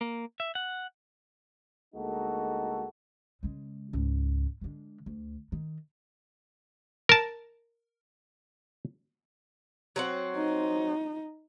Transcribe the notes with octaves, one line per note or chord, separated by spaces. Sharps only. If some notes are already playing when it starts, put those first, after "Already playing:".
A#3
E5
F#5
D2 G#3 A#3 D#4 F#4 A4
C#3 G#3
C#2 G#2
D3 G#3
D2
D#3
A#4 A5
F#3 C4 F#5
D#4